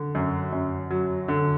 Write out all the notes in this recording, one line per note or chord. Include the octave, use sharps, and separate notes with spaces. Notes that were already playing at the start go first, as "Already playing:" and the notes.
Already playing: D3
F#2
F#2
F#3
D3